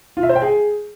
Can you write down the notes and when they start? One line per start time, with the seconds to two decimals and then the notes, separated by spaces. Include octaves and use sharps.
0.17 F4
0.23 E5
0.29 C5
0.36 G5
0.42 G#4